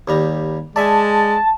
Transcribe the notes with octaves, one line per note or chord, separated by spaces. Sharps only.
D#2 G3 A#5
G#3 D5 E5 G#5 A5